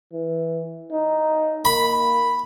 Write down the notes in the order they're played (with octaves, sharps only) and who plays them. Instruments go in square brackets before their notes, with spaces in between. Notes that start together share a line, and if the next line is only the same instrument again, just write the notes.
[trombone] E3
D#4
[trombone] A#3 [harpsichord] B5